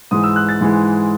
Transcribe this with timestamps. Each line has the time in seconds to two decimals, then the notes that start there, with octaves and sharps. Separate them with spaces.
0.11 G#2 E3 G#3 D#6
0.23 E6
0.36 F#6
0.49 A6
0.61 G#2 E3 G#3